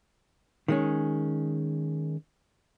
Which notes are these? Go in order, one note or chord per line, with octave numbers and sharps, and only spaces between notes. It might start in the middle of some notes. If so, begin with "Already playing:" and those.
D#3 G#3 C#4